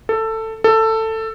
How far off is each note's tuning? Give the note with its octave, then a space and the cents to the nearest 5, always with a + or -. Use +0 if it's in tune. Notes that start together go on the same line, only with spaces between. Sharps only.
A4 +15
A4 +15